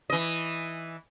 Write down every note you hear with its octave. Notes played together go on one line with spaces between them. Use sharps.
E3 D#5